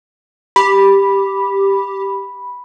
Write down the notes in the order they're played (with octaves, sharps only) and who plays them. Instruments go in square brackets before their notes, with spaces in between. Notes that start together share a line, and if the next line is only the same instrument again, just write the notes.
[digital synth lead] G4 [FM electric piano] B5